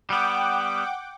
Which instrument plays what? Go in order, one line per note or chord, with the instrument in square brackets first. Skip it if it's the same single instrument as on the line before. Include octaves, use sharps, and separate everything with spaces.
[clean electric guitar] G3 B3 [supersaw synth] F#5 G5 D6